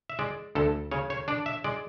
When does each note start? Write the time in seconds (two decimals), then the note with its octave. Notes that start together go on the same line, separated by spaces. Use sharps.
0.10 E5
0.19 G#3 D5
0.55 D2 A4
0.91 C#3 C#5
1.10 C#5
1.28 D4 D5
1.46 E5
1.64 G#3 D5